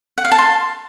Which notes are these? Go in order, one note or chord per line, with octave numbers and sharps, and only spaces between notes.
F#5
F5
A5
C6